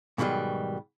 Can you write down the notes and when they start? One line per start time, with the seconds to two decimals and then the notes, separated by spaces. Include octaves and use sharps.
0.18 G#2 B2 D#3 F#3 G3